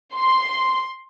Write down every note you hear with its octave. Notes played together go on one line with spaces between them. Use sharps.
C6